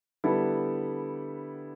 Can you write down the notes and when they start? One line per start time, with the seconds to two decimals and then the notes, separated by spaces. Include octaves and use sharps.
0.24 D3 G3 B3 E4 A4